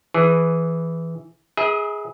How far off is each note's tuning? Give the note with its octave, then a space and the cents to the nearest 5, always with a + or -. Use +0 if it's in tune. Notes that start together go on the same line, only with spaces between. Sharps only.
E3 +0 G#4 +0 B4 +0
G#4 +0 B4 -45 E5 -45